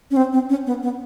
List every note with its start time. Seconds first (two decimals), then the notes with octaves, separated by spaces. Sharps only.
0.11 C#4
0.16 C4
0.33 C4
0.49 C#4
0.66 B3
0.83 B3